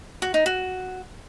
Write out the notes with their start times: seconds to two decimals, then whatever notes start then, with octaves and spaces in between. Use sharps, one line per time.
0.22 F#4
0.34 D#4
0.46 F#4